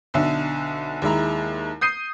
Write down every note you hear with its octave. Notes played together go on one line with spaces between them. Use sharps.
B1 D3 E5
D#2 G#3 E4 A#5
D#6 G6 C7 D#7